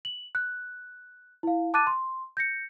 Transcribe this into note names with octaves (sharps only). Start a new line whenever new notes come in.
F#7
F#6
E4 F5
A5 D6 F#6 A6 D#7
C6
G6 A#6 C#7